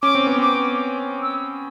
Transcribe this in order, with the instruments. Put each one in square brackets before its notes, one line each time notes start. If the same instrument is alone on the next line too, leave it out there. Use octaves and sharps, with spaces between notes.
[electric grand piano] C#4 [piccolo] D6
[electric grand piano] C4
B3
[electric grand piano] C4 [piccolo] D6
[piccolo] E6